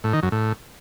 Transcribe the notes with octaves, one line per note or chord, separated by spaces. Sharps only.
A2
D#3
F#2
A2